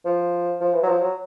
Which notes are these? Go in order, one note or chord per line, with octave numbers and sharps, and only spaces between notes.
F3
F3
E3
F#3
F3
F#3